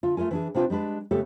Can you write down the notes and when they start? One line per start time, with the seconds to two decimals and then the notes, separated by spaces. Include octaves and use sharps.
0.03 D3 F4
0.17 A3 F4 A#4 G#5
0.31 E3 D4 G#4
0.54 C3 D4 F4 B4 G5
0.70 G3 G#3 D4 B4
1.11 C#3 A3 B3 G4 A4